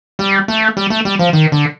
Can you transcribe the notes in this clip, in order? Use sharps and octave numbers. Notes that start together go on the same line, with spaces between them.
G3
A3
G3
A3
G3
F3
D#3
D3